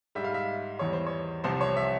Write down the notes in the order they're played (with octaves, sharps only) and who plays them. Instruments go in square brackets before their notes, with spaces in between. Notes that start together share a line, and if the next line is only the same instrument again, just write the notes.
[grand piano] G#2 G3 E5
F5
E5
E2 E3 G3 C#5
C5
C#5
C2 C3 F3 C5
C#5
E5